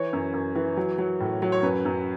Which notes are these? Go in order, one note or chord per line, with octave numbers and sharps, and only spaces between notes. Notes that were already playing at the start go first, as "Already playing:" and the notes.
Already playing: E3 C#5
F#2
F#2
E3
F#3
F#3
A2
F#3
C#5
F#2 B4
F#2